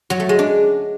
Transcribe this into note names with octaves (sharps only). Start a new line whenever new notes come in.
F#3
A3
G#3
D4